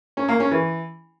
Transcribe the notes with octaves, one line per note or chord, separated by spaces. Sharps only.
C#4
A#3
C#4
E3